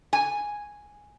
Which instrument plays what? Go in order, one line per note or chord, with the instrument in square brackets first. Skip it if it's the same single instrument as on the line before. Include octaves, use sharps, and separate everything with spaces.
[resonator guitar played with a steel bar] G#5